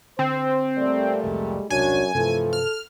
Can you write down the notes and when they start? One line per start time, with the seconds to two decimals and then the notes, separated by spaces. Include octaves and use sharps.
0.19 D3 C4 C5
0.77 A#2 G3 A3 D5
1.23 F1 C2 F2 G#3
1.70 E1 C2 F#2 D4 F#4 C#5 G#5
2.15 G2 C3 E3 F3 A3 C4 A4
2.53 F6